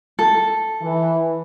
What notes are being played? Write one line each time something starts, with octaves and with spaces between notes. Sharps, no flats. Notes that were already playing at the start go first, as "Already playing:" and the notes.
A4
E3